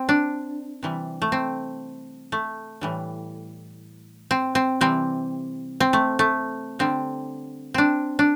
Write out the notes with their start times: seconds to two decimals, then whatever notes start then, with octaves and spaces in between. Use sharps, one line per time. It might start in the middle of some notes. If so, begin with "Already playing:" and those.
Already playing: C4
0.09 D4
0.83 C3 E3 G3
1.22 A3
1.32 C4
2.32 A3
2.81 A2 E3 G3
4.31 C4
4.55 C4
4.81 C3 E3 G3 C4
5.80 C4
5.93 A3
6.19 A3
6.79 D3 G3 C4
7.74 C4 D4
8.19 D4